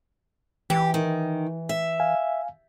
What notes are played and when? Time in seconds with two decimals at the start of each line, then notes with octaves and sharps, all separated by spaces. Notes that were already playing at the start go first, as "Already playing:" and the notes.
0.70 E3 G4
0.94 D#3
1.69 E5
2.00 F5 G#5